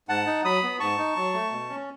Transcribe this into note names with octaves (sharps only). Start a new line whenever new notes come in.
G#2 F#5 A5
D#4
F#3 B5 D#6
B3
G#2 A5 C#6
D#4
F#3
A3
B2
C#4